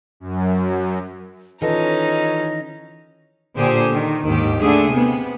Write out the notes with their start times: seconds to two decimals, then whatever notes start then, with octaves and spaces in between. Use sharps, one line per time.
0.20 F#2
1.62 D#3 E3 C#4 D#4 F4 A4 B4 D#5
3.56 A#2 D3 G4 G#4 C5
3.91 D#3
4.25 D#2 G#2 D#3 G4
4.60 D3 A3 G#4
4.93 C3 B3